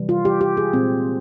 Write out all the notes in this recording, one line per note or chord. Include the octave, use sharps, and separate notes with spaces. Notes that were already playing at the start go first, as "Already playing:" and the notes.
Already playing: C3 E3 G3
F4
G4
G4
G#4
A#2 G#3 C4